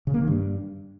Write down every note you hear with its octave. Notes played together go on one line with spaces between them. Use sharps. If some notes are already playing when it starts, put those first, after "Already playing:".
C#3
A#3
D#3
G2